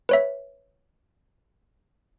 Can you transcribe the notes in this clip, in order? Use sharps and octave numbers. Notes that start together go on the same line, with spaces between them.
B4 C#5 E5